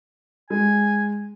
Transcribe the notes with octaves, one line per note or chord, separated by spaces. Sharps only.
G#3 G#5